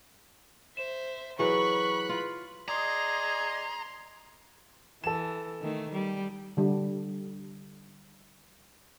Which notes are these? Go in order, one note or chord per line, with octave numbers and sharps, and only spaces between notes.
C5 E5 E7
E3 F#3 G#4 B4 B5 C#6 F#6
F4
G#4 D5 D#5 A#5 C6
E3 A4 E7
D#3 A3
G3
D3 G3